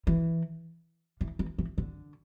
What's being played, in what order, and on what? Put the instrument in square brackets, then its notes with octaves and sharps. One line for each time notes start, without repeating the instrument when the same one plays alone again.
[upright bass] E3
E3
E3
E3
D3